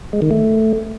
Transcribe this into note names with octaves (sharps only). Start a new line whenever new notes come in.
G#3
D#3
A3